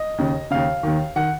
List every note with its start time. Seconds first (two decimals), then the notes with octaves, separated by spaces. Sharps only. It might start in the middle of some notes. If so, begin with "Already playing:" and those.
Already playing: D#5
0.18 D#2 C#3
0.51 D#2 C#3 F5
0.83 D#2 D#3
1.16 D#3 F#5